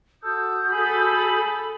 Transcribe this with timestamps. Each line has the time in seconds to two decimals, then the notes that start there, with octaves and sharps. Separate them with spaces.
0.23 F#4 A4 D#6 G6
0.71 G#4 A4 B5